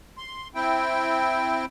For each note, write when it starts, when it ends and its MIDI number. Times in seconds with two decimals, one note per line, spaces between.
0.18 0.48 84
0.55 1.65 60
0.55 1.65 64
0.55 1.65 79